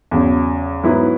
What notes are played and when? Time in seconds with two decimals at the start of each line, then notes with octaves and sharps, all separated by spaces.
0.11 E2 C#3 F#3
0.83 G#2 F#3 B3 E4